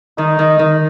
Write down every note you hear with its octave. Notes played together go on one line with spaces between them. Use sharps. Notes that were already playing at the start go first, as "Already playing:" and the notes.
D#3 D#4
D#3
D#3